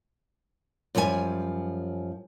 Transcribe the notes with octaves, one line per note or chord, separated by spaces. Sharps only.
F#2 F3 G3 A4 G#5